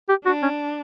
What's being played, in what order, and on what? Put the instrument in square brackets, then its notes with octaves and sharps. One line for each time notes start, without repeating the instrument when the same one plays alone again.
[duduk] G4
[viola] D4 [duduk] F#4
[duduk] C#4